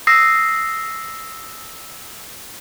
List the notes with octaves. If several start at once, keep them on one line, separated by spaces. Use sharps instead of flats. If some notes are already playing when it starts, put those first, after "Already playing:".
D#6 E6 A#6 C7